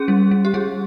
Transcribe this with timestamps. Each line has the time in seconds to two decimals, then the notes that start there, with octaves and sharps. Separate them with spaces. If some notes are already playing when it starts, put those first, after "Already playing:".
Already playing: C#4 G#4
0.08 G3
0.31 G3
0.45 G4
0.54 G3 G#4